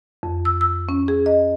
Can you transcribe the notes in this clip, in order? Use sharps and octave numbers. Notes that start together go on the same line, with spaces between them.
F2
E6
E6
C#4
G#4
D#5